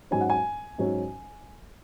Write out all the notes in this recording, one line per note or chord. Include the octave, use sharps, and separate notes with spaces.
G#2 F#3 C#4 G#5
F#5
G#5
G#2 F#3 C#4